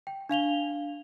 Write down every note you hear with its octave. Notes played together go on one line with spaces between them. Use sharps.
G5
D4 F5 F7 G7